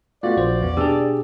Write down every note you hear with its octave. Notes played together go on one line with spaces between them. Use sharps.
A3 B3 F4 F#4 D5
A#1 C5
E2 B3
B2 D4 G4 G#4 E6